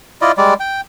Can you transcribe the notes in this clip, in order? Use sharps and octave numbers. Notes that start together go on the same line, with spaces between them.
E4 F4 D5 D#5
G3 G#3 D5
G5